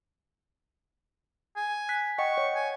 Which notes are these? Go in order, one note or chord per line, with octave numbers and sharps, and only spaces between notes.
G#5
F#6 B6
D#5 F#5 G5 C#6
C#5
G#5